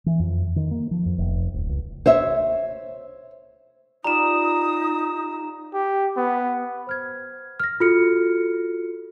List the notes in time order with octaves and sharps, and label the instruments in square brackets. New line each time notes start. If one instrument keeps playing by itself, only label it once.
[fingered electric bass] E3
F2
D#3
A#3
F3
F2
F1
D1
C#2
[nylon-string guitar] C5 C#5 E5
[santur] G3 F4 B5 [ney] D#4 [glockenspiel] A#5 E7 [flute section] D#6
[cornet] G4
B3
[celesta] C5 F6 G#6
F6 A#6
F4 F#4 A4 F6 C#7